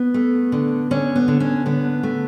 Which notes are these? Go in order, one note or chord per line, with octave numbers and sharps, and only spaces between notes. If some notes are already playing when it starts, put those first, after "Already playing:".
Already playing: B3
A3
D3
D3 C#4
B3
D3
C#4
D3 B3
A3